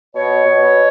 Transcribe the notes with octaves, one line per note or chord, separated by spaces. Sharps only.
B2 C#5
B2